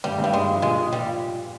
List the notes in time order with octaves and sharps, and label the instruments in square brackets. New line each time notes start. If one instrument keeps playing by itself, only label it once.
[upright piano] G2 [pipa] G3
[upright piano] G2
[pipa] G3
[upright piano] G2 [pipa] G#3
[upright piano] F3
[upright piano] A#2 [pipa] G#3
[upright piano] A#2
[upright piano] A#2 [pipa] G3